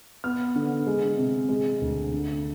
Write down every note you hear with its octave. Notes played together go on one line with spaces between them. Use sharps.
B3 F6
D3
G#3
C3
G#3
D2
D3